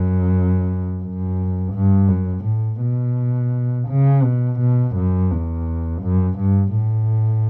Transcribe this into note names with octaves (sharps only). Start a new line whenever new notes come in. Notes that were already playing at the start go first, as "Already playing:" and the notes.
Already playing: F#2
F#2
G2
F#2
A2
B2
C#3
B2
B2
F#2
E2
F#2
G2
A2